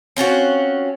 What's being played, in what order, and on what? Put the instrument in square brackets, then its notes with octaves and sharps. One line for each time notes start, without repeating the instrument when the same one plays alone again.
[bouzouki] C4 C#4 F4 F#4